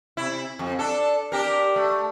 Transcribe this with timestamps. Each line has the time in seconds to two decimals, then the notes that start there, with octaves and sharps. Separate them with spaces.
0.17 C3 E4
0.59 F2
0.79 D4 A4
1.32 D4 G4 A#4
1.76 A3